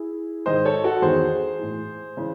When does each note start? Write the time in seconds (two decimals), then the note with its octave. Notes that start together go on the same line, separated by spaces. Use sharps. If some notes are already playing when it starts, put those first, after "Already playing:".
Already playing: E4 G#4
0.46 G#2 D#3 C5 D#5
0.65 A4 C#5
0.84 F#4 A4
1.02 E2 D#3 G#4 C5
1.59 A2 E3
2.17 C#3 E3